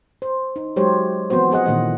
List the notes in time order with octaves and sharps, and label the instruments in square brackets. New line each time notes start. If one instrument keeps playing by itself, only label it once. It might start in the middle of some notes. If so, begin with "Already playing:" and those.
[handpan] C5
D#4
F#3 G#3 G4 C5 C#5
E3 F3 B3 C4 F#4 C5
F3 B3 G#4 D#5 F#5
A#2 D#3 E3 A3 D#5